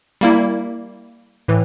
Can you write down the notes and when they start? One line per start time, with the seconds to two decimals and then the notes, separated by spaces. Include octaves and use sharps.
0.21 G3 A#3 E4
1.48 A2 E3